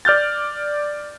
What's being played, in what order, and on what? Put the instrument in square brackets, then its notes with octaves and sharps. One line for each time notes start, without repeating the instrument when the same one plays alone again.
[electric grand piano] D5 F6 G6 A6